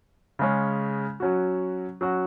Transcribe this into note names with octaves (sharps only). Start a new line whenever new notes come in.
C#3 G#3 C#4
F#3 C#4 F#4
F#3 C#4 F#4